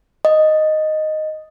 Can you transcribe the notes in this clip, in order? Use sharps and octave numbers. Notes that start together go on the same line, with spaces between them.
D#5